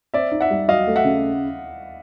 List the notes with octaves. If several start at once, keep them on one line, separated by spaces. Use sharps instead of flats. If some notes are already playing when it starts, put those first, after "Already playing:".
C4 D5 E5
D#4
E5 F#5
G3
F#3 D#5 F5
A3
E5 F#5
C#3